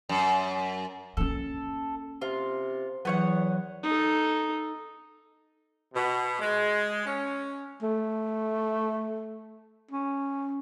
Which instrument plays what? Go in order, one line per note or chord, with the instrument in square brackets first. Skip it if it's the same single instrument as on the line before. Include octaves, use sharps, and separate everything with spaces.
[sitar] F#2
[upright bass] A#3 C#4 [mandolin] A4
[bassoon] C3 [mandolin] F4
[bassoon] E2 [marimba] E3 F#3 [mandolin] B3 C#5 F#5
[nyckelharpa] D#4 A4
[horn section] B2
G#3
C#4
[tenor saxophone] A3
C#4